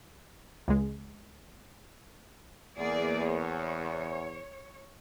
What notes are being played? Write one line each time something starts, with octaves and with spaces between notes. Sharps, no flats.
C#2 G#3
E2 A#3 G#4 D5
C#5